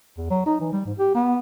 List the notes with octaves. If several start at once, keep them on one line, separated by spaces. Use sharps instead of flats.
E2
F#3
D#4
E3
G3
G#2
G4
B3